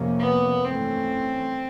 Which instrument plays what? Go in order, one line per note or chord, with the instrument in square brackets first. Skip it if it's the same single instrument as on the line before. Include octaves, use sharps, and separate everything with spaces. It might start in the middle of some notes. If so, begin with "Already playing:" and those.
Already playing: [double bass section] F2 C3 F3 A#3 C#4
[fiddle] B3
[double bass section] G2 E3 A3 C#4 [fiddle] C4